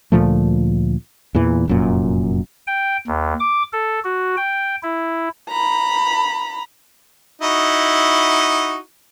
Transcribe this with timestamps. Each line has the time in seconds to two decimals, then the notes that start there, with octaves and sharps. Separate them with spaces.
0.12 D2 A#2 F3 A3
1.35 E2 A#2 E3
1.68 F1 F#2 A#2
2.67 G5
3.07 D#2
3.40 D6
3.73 A4
4.04 F#4
4.37 G5
4.83 E4
5.49 A#5 B5
7.42 D#4 E4 F#4